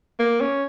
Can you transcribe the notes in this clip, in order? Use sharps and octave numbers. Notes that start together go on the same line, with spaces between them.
A#3
C#4